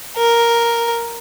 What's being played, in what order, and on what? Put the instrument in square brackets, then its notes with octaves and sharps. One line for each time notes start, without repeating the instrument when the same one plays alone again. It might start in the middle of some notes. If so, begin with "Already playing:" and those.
[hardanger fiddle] A#4